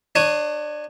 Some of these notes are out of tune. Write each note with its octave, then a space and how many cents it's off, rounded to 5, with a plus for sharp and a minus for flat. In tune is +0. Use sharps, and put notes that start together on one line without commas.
D4 +30 C#5 +0 D#6 +0